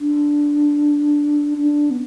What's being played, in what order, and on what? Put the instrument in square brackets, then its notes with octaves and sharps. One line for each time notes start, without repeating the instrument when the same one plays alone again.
[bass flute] D4
D4
B3